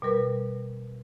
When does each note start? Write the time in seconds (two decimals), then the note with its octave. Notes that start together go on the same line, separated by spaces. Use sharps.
0.02 B2 G3 A#4 B4